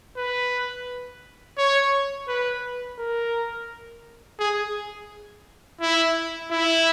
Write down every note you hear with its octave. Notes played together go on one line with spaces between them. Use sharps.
B4
C#5
B4
A#4
G#4
E4
E4